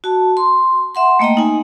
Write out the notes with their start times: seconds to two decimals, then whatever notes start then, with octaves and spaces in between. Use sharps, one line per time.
0.04 F#4 A5
0.37 C6
0.95 E5 F#5 C6
1.19 A3 A#3 D#5 G5 A#5
1.37 D#4 G#5